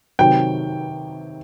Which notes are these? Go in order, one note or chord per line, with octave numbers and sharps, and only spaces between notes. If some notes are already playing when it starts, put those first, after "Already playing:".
C3 D#3 F#3 G5